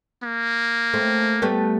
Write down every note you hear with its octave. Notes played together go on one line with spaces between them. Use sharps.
A#3
A3 C4
G3 A3 B3